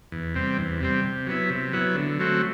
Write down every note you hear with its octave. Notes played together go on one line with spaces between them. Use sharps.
E2
C3 G3 C4
E2
C3 G3 C4
C3
F#3 B3 E4
C3
F#3 B3 E4
D3
F#3 A3 C4 F#4